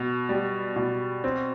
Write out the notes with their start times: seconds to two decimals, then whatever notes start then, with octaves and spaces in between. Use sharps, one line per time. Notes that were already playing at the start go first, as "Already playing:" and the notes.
Already playing: B2
0.29 G3
0.76 B2
1.24 C4